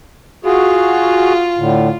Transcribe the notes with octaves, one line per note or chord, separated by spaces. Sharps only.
F4 F#4 G#4
A2 D3